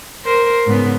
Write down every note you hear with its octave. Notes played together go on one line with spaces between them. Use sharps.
A#4 C5
G#2 C#3 B3